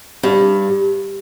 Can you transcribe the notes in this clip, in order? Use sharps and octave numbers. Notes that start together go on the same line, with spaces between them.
G2